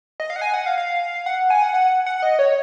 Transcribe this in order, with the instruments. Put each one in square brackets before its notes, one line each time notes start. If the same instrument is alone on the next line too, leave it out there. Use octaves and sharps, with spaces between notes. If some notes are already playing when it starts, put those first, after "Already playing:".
[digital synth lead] D#5
F5
F#5
G#5
F#5
F5
F5
F#5
G#5
F#5
F#5
F#5
D#5
C#5